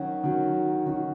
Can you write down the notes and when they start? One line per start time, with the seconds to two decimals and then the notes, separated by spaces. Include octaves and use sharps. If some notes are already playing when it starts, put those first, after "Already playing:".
Already playing: D#3 F#3 C#4 F#4
0.24 D#3 F#3 C#4 F#4
0.86 D#3 F#3 C#4 F#4